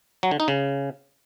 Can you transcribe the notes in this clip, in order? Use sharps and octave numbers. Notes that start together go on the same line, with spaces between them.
F#3
D3
D#4
C#3